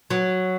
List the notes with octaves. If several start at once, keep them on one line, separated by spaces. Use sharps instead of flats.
F#3